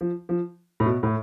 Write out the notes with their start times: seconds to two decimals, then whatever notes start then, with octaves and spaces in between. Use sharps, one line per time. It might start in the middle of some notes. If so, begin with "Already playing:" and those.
0.01 F3
0.29 F3
0.80 A2
0.86 B2
1.03 A2